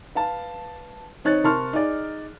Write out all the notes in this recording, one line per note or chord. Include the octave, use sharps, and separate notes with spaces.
B4 F5 A5
D#3 C4 D#4 C#5 F#6 A6
C3 A#4 A5 C6 C#6 F6
D#4 G#4 D5